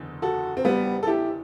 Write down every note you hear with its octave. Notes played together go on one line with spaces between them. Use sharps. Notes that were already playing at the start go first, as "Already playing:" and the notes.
Already playing: F#1 E2 D3
F#4 A4
C4
G3 B3
A4
E4 G4